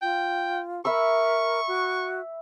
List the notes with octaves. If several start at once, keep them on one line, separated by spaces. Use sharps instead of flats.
F4 G5
A#4 E5 B5 C#6 E6
F#4